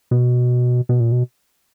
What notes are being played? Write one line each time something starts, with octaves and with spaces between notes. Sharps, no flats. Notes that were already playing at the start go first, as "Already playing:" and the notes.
B2
B2
A#2
B2